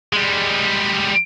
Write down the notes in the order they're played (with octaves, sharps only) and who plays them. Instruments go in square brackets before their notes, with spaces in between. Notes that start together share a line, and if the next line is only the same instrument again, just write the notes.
[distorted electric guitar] G3 G#3